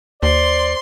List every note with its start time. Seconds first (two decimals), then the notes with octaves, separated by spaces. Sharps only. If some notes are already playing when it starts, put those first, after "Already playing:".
0.23 D#2 C5 D5 C6